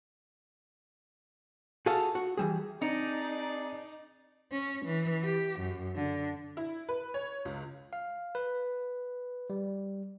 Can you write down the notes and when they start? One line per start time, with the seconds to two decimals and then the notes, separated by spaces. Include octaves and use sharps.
1.86 F#4 G#4 A4 F5
2.15 F#4
2.37 E3 G3 G#4
2.82 C4 D4 D#4 G#4 D5 A#5 C#7
4.52 C#4
4.86 E3
5.25 G4
5.60 F#2
5.96 D3
6.57 E4
6.89 B4
7.14 C#5
7.45 C#2
7.93 F5
8.35 B4
9.50 G3